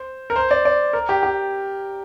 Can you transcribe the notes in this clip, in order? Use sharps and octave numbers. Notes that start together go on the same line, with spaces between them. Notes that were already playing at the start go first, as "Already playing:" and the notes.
Already playing: C5
A#4
C5
D5
D5
A#4
G4
G4